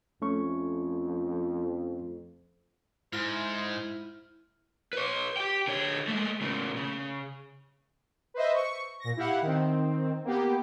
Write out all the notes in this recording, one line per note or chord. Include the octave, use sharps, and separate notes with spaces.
F2 A3 C#4 C#6
G#2 E4 C5 F6
B4 C#5
G4 G5
D3 C#5
G#3 A3
A2 C#3
C#3
B4 C5 D#5 E5
C#6
A#2 A#6
E4 G4 F5 F#5
D#3 C4
A#3 B3 G4